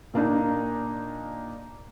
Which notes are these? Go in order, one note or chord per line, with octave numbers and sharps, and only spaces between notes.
A#2 A#3 D4 D#4